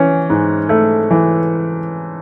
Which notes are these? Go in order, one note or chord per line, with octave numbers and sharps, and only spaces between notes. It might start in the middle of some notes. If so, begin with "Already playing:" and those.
Already playing: E3 C#4
G#2
A3
E3